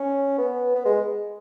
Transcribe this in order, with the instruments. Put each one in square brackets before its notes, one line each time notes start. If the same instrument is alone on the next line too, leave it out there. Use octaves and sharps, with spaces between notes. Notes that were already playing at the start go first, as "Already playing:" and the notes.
Already playing: [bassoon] C#4
B3
B3
G#3